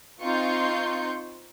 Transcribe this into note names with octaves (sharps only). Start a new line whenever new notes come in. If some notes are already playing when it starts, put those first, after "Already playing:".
C4 D#4 F4 C6 C#6 G6